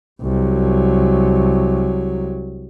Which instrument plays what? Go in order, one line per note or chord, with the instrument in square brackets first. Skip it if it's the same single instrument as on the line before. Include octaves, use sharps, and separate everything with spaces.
[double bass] C2 F#3